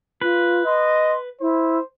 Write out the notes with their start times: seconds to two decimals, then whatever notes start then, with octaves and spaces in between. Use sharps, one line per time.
0.21 F4 B4
0.66 D#5 C6
1.40 E4 C5